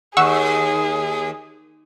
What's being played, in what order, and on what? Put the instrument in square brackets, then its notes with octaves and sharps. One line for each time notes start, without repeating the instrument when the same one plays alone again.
[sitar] D#2 [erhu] G#4 [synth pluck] F#5 C#6 E6